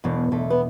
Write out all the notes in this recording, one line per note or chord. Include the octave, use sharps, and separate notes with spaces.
E1 B2
E1 A3
B3